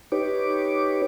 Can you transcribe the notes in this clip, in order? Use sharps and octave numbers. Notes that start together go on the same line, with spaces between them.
D#4 G4 B4 C#5 D6